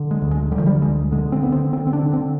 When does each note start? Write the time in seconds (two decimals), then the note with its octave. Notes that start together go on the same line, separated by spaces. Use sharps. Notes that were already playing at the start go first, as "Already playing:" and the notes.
Already playing: D3
0.11 G#3
0.21 D2
0.31 G#3
0.52 D3 G3
0.59 F3
0.66 G3
0.81 D2 G#3
1.12 D3 G#3
1.32 C4
1.42 D3 B3
1.52 C4
1.73 D3 C4
1.87 C4
1.93 D4
2.03 D3
2.13 C4